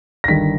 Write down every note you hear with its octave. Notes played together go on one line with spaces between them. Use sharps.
A#6
G1 G2 D#3 B6